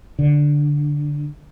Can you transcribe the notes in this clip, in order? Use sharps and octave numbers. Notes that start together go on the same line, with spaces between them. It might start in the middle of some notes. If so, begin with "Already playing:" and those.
D3